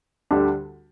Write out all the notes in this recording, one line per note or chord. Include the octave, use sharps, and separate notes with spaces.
D2 D3 G3 D4 G4